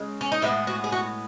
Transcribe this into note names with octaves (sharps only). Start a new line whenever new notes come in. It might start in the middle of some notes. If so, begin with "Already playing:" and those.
Already playing: C#3 G#3
C#4
D#4
A2 G#3 B3 E4
F#4
G#4
F#4